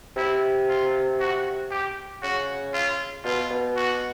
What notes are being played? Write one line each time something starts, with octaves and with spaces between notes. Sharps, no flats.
C3 E4
F4
F#4
G4
C#3 F#4
F4
B2 F4
B2
F#4